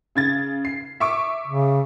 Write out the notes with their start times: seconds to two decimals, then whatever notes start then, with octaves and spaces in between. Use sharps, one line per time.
0.15 C#3 G#6 A6
0.65 C7
1.00 E5 C#6 D6
1.47 C#3